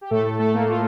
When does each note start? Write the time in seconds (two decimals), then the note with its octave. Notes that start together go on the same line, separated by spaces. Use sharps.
0.01 G4
0.10 A2 A3 A4
0.39 A3 A4
0.54 A#3
0.69 F4